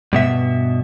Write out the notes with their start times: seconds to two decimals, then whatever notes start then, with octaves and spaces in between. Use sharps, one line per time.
0.13 G2 B2 E5